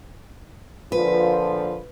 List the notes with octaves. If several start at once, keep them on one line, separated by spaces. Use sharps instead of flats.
A#2 D3 F3 B4